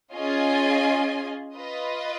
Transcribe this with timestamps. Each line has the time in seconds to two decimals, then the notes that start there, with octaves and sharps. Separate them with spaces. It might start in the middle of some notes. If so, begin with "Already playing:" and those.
0.11 C#4 F4 G#4 D#5 G#5
1.54 F4 B4 D#5